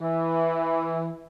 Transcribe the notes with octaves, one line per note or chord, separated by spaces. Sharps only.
E3